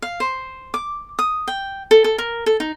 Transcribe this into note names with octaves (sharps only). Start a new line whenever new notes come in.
F5
C5
D6
D#6
G5
A4
A4
A#4
A4
D#4